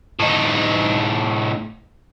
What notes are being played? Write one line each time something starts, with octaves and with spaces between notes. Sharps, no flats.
A2 D#4